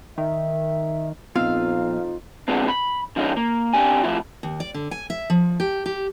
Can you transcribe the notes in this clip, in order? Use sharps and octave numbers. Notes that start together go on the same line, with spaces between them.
D#3 E5
A#1 F2 B3 C4 D#4 F4 F5 E6
D3 F3 G#3 B3 C4 D4
B5
D3 F3 G#3 C#4 D#4
A#3
C2 C3 D4 G4 G#5
A2 F3 E4 F4
D#2
D5
D3
G#5
E5
F3
G4
G4